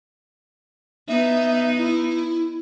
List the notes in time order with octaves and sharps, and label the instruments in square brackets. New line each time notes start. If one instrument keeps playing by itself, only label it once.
[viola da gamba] B3 D#4 [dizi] E5
[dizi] E4